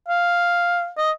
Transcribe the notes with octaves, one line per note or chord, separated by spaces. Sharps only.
F5
D#5